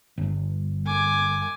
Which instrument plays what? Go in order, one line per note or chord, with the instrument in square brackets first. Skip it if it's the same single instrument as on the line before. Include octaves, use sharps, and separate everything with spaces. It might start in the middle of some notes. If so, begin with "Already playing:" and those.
[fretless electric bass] G1
[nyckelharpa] G#5 D6